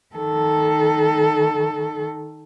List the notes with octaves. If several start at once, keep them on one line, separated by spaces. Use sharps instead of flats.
D#3 A4